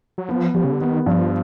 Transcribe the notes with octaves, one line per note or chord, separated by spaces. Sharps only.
F#3
F3 B3
F3 G3
C#3
D3
D#3 B3
G2 F3